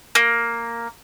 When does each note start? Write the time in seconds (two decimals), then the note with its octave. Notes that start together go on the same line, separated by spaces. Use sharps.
0.15 A#3